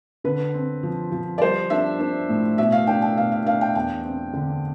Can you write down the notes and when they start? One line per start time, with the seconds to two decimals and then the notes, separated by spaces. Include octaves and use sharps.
0.24 D3 B4
0.54 C4
0.83 F3
1.12 F3
1.38 D5
1.42 G3 C5
1.70 D4 E5
2.00 D4
2.29 A2
2.58 B2 E5
2.72 F5
2.87 D4 G5
3.02 G5
3.17 B2 F5
3.32 F5
3.46 D4 F5
3.61 G5
3.75 E2 G5
4.04 C4
4.33 D3